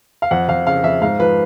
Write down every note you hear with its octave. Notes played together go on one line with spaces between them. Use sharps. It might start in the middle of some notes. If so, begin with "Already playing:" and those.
F5
F2 F#5
F2 F5
C#3 F5
F2 E5
G#2 F5
F3 B4